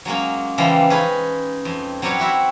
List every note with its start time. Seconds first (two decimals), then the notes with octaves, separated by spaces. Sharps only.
0.05 F#3 G#3 A#3 C#4
0.58 C#3 E3 F3 G3 G#3
0.90 C#4 D#4 G#4 B4
1.65 F2
2.02 F#3 G3 C4 G4 C#5 F#5
2.19 E4 F#4 E5